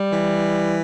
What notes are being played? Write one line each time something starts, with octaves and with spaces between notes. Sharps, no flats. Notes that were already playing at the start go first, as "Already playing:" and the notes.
Already playing: G3
E3